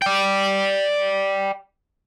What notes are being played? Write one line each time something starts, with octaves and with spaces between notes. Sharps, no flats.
D5 G5